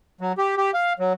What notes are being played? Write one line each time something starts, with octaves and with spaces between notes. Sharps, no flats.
F#3
G4
G4
F5
F#3